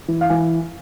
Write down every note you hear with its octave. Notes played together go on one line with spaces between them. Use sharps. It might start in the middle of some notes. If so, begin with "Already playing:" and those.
E3
F5
E3 G#5